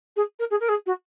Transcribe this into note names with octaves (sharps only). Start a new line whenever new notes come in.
G#4
A#4
G#4
A#4
G#4
F#4